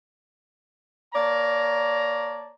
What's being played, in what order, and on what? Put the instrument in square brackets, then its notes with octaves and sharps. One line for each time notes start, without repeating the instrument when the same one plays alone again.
[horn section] A#3 C#5 D5 A5 A#5